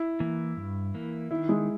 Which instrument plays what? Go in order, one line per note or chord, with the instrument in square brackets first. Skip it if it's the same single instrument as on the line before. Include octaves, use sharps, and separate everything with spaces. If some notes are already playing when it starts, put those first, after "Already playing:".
Already playing: [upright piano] E4
[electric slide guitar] E3 A#3
G2
E3 A#3
[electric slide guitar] D#3 [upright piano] E4
[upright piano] G#3